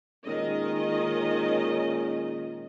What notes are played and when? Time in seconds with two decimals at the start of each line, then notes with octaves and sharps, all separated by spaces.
0.25 A#2 D#3 G#3 C#4 D#5